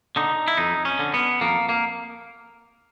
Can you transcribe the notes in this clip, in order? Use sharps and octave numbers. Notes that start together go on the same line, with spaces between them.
D3 D#4
E4
F2 D#4
C#4
D3
B3
F2 A#3
A#3